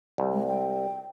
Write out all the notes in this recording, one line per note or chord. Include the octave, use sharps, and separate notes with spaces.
C2
G#3
G5